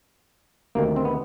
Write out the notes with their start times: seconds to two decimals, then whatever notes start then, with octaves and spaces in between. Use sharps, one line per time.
0.75 D2 C3 D#3 A#3
0.96 C4
1.05 B3